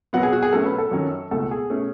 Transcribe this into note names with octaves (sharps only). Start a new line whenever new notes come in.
B2 F#3 B3 F#5
G#4
F#4
G#4
B2 F#3 A3 C#4 A4
B4
A4
F#2 D#3 F#3 C#4
C#2 B2 A3 A4
G#4
B2 A3 C#4